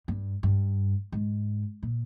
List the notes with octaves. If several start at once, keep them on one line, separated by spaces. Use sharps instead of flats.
G2
G2
G#2
A#2